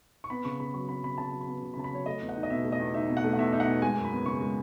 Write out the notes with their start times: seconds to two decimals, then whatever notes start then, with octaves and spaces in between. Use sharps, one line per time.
0.24 C#6
0.30 B3 B5
0.44 C#3 C#6
0.60 C#3 B5
0.74 F#3 C#6
0.89 B3 B5
1.04 C#3 B5
1.18 C#3 A5
1.33 F#3
1.41 B5
1.48 B3
1.63 C#3
1.74 B5
1.77 C#3 A5
1.84 B5
1.92 F#3 C#5
2.06 A3 D#5
2.21 E2
2.29 F#5
2.36 D#4
2.43 D#5
2.50 B2 E5
2.64 A3
2.72 D#5
2.80 E2
2.94 D#4 E5
3.08 B2
3.17 F#5
3.24 A3
3.33 F#5
3.39 E2 E5
3.53 D#4 E5
3.60 F#5
3.68 B2
3.82 G#3 G#5
3.97 F#2
4.05 B5
4.12 B3
4.26 C#3 C#6
4.41 G#3